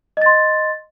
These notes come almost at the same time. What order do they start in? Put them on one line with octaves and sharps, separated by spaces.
D#5 A6 C6